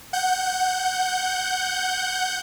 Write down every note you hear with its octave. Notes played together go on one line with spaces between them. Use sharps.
F#5 G6